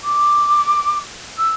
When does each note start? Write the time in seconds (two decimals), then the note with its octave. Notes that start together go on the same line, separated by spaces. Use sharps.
0.04 D6
1.37 E6